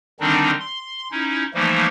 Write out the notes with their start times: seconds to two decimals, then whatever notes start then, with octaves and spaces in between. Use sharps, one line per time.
0.20 D3 D#3 G3 C4 D4 D#4
0.59 C6
1.11 C#4 D#4 E4
1.54 E3 F3 G3 A3 A#3 D#4